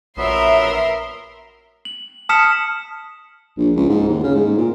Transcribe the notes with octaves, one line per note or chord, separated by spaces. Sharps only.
A#1 F#3 B3 A#4 E5 C6
F#7
A5 D#6 F6 B6 C#7 E7
A#1
C#2
G#2
D#2
C#3
G#2
A#2